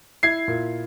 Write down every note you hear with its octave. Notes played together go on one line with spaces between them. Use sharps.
E4 G#6 C7
A#2